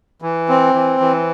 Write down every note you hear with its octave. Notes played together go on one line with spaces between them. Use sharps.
E3
C4
E3
E3